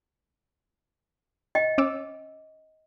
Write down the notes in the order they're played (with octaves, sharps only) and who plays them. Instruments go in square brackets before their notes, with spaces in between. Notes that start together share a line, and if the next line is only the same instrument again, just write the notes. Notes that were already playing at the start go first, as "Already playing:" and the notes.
[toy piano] D#5 G5
[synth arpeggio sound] C#4 D6 E6